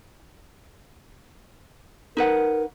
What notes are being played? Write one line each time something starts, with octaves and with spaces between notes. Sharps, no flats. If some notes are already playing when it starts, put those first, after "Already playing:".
D#4 A#4 B4 F#5